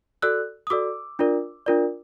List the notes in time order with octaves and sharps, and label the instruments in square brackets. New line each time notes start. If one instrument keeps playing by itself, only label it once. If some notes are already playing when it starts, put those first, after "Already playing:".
[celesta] F#4 A4 D5 E6 F#6
D#6
F#4 A4 D5 D6 E6
D4 F4 A#4 D5
D4 F4 A#4 D5